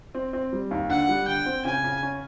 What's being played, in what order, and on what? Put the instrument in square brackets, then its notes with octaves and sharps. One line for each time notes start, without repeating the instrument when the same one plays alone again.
[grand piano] C4
C4
G3
D#2
[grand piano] D3 [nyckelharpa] F#5
[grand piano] G3
[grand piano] D3 [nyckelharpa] G5
[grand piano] C4
[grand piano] C#3 [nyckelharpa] G#5
[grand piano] C#3
C#4